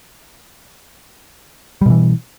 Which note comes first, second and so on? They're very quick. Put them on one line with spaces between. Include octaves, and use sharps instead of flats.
G3 B2 E3